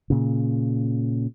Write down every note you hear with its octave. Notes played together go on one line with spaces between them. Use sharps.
A#2 C#3